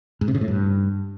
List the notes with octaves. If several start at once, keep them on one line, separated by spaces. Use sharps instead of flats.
G#2
C3
C#3
A2
G2